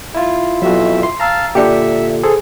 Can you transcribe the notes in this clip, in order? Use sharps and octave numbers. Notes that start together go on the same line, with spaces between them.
E4 F4
F2 B2 F#3 F#4 E5
C6
F5 A5 A#5 E6
A#2 D3 D4 G4 E5 C#7
G#4 A4 C5